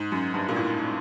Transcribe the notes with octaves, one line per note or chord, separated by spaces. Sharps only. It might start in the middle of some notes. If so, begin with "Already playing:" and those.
Already playing: G#2
F#2
G2
A#2
A2